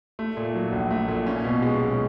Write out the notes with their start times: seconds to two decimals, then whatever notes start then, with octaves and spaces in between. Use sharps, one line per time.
0.19 A3
0.37 A#2
0.55 F#3
0.72 A#1
0.91 A3
1.08 A#2
1.26 C#4
1.44 B2
1.62 G#3
1.81 B1